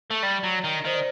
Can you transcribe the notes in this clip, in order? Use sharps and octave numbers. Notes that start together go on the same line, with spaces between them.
A3
G3 D5
F#3
D#3
D#3 C5
D5